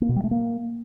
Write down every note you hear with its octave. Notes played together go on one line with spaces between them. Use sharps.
A#3
B2
G3
A3
A#3